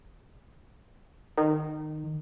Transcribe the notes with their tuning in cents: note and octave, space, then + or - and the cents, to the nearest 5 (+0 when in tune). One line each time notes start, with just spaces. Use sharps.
D#3 -20